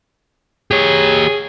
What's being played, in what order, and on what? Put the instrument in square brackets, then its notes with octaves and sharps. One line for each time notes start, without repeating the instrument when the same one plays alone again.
[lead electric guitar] G4 C#5 [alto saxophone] G#4